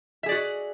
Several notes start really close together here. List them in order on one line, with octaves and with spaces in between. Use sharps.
E5 G#4 D5 F#4